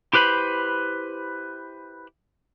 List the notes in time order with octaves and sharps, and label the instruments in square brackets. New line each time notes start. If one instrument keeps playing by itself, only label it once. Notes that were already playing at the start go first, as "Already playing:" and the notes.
[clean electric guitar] E4 G4 B4 C5 B5